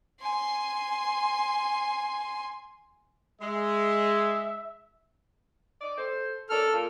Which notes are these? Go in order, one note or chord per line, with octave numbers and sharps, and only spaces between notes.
G#5 C6
G#3 E5
D#4 D5
A4 C5
F#2 A4 A#4 D5 F6
A#2